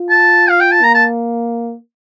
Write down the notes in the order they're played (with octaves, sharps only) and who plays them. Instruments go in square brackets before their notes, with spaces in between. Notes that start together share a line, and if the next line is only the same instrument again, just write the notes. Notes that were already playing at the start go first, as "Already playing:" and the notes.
Already playing: [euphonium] F4
[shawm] A5
F5
G5
A5
[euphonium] A#3 [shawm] A#5
[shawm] A5